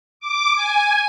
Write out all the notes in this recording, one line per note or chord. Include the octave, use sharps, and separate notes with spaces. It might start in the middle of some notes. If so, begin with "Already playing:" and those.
D6
G#5